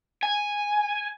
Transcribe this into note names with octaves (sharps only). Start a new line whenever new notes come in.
G#5